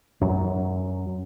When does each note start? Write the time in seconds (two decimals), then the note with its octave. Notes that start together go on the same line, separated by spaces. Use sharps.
0.21 F#2 F#3